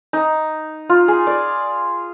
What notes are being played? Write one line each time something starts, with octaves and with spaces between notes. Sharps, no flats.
D#4
F4
G#4
D5